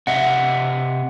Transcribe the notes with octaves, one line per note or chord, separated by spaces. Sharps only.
C3 D#5 E5 F#5